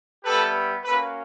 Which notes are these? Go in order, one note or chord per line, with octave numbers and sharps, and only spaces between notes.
G3 B3 E4 G4 A4 B4
A#3 C#4 F#4 A4 B4